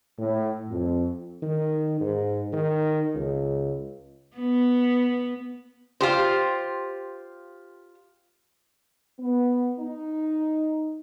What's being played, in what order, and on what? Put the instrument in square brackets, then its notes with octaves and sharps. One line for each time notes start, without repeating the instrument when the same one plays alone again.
[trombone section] A2
F2
[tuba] D#3
G#2
D#3
C#2
[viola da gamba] B3
[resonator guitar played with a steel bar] F4 G4 C5
[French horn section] B3
D#4